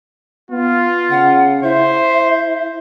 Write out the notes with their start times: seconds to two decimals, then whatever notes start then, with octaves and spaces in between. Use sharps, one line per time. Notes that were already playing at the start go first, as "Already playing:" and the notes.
0.51 B3 F4
1.10 C#3 F#5
1.63 E4 C5 E5